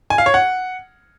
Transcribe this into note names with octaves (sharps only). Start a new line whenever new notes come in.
G#5
F5
C#5
F#5